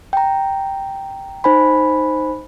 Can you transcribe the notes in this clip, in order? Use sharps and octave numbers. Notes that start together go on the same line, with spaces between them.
G5 A#5
D#4 C5 G#5 B5